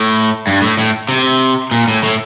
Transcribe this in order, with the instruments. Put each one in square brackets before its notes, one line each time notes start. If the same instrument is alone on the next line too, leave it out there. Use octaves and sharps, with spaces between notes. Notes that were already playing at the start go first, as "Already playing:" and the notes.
Already playing: [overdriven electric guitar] A2
G2
A2
A2
C3
A#2
A2
A2